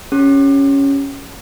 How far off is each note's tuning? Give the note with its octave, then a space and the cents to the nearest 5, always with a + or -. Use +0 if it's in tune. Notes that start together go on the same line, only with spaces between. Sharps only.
C#4 +0 G4 +0